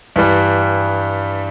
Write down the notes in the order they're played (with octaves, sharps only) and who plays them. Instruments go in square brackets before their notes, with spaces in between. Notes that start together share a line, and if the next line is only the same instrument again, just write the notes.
[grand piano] G2 E3 G3